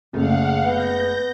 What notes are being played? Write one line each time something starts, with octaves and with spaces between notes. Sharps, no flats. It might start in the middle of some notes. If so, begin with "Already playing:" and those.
F#1 C#3 A3 F5 F#5
B3 G6 A#6